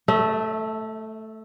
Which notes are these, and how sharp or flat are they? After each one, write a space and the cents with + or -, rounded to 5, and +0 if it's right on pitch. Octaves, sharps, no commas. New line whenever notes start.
A3 +0 E5 -35